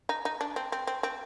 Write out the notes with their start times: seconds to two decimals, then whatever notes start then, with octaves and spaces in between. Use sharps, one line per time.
0.09 D#4
0.25 D#4
0.41 D4
0.56 C4
0.72 C4
0.87 C4
1.03 C4